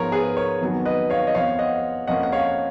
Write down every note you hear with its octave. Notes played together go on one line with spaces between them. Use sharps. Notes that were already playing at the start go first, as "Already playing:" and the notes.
Already playing: G#2 F3 B3 A#4 C#5
G#4 B4
A#4 C#5
F2 D#3 F#3 B3
B4 D#5
C#5 F5
D#5
F2 F3 B3 C#5 F5
D#5 F#5
F2 F3 A#3 C#4 D#5 F#5
F#5
C#5 F5